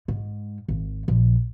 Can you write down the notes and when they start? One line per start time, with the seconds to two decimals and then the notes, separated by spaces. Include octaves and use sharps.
0.08 G#2
0.68 G#1
1.08 A#1